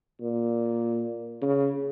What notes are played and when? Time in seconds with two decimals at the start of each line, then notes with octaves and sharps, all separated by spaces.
0.21 A#2
1.42 C#3